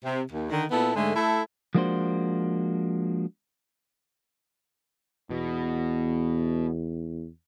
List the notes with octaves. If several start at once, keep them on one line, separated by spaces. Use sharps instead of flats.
C3
D#2
D3 D#3
A#2 B3 E4 A4
G#2 D3 G#3 A3
A3 E4 A4
F3 G#3 A#3 D4 F#4 C5
E2 B2